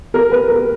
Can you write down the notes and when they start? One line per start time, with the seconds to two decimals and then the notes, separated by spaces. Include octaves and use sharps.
0.14 A#4
0.31 B4
0.49 A#4